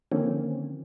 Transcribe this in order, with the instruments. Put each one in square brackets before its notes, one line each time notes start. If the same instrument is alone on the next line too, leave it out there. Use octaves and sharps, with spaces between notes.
[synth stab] D3 D#3 F3 A#3 C4 C#4